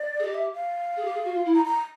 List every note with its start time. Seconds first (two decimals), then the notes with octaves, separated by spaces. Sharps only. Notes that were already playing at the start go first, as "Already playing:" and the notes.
Already playing: D5
0.19 G#4
0.24 G4 D#5
0.34 E5
0.54 F5
0.97 G#4
1.05 G4
1.14 G#4
1.25 F#4
1.35 F4
1.45 E4
1.54 A#5
1.65 A#5